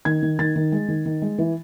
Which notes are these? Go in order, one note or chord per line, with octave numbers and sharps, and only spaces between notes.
D#3 G#6
D#3
D#3 A6
D#3
G#3
D#3
D#3
G#3
E3